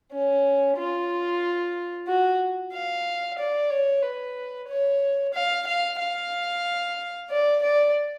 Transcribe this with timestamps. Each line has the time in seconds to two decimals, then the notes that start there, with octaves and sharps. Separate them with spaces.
0.12 C#4
0.77 F4
2.08 F#4
2.73 F5
3.39 D5
3.71 C#5
4.03 B4
4.68 C#5
5.34 F5
5.67 F5
5.99 F5
7.30 D5
7.62 D5